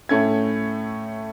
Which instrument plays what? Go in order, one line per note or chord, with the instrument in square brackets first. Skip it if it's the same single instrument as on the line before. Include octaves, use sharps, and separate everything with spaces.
[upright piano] A2 A3 C#4 G#6